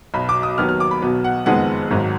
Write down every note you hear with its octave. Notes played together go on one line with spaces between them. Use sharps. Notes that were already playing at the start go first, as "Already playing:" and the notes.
B1 B2 F#3 B5
D6
D#6
D#2 D#3 F#3 B3 F6
F6
D6
B5
B1 B2 F#3 B3
F#5
F#1 F2 D#3 G#3 B3 F#5
G#1 G#2 D#3 F#3